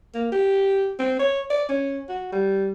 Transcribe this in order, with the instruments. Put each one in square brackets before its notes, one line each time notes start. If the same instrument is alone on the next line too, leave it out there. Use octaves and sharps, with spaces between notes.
[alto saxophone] A#3
G4
C4
C#5
D5
C#4
F#4
G3